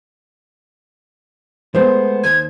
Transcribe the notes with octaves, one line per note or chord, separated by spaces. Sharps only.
G#3 A3 B3 C5
D#2 G#6